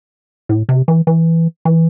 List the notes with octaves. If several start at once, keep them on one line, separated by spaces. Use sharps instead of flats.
A2
C3
E3
E3
E3